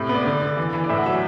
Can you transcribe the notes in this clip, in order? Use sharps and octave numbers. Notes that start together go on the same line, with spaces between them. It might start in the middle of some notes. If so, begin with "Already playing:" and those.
Already playing: A2 C3
B3
D5
D3 D5
D3
E3
E3
D5
A2 E5
F#5
F#3 E5